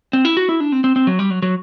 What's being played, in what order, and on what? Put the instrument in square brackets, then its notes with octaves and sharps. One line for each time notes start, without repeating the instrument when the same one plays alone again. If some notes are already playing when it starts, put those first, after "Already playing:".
[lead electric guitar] C4
E4
F#4
E4
D4
C4
C4
C4
F#3
G3
F#3
F#3